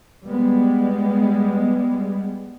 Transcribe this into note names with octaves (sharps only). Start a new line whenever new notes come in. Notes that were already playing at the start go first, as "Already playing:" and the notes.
G3 G#3 B3